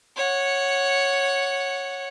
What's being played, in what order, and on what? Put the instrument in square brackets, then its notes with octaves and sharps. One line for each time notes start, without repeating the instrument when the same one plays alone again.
[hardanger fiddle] C#5 F#5